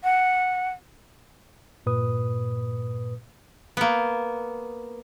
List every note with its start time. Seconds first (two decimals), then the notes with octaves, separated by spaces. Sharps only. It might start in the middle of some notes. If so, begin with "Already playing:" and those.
0.04 F#5
1.86 G2 A#2 B4 D#6
3.77 A#3 B3